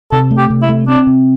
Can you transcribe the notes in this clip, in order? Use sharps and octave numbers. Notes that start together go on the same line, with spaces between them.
C3 A4
A3
G4
C3
E4
A3
C4 D4
C3